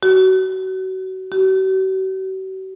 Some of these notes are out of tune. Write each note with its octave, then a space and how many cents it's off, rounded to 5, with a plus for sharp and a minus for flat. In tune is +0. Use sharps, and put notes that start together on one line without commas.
F#4 +30
F#4 +45